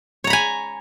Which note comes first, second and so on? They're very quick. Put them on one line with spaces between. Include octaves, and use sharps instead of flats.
C#5 A#5 B5 G#5